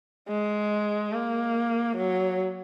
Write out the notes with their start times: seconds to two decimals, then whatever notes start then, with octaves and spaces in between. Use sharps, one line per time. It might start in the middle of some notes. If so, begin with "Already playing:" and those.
0.28 G#3
1.13 A#3
1.97 F#3